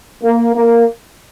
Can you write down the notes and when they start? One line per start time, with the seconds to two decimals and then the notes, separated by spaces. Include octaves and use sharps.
0.23 A#3
0.56 A#3